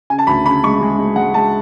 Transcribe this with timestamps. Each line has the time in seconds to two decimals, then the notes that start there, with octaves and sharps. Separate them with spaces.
0.10 C#3 G#5
0.19 A5
0.27 D2 B5
0.45 C#3 B5
0.64 G#3 C#6
0.81 G#3
0.99 G#3
1.16 G#3 F#5
1.34 G#3 A5